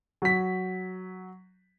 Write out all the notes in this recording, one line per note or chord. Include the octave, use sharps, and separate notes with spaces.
F#3 B6